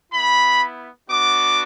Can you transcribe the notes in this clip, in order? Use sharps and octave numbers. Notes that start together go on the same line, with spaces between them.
B3 E4 B5
B3 D4 F#4 D6